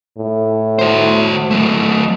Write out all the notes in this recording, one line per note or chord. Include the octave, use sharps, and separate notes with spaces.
A2
F#4 C5
F#3 A3